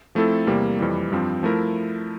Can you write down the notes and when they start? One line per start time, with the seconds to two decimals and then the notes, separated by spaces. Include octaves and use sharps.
0.15 F3 A3 C4 E4 A4
0.47 E2 C3 G3 A#3
0.79 F2 E3 G3
1.12 G2 F3 C4
1.43 F3 A3 E4 A#4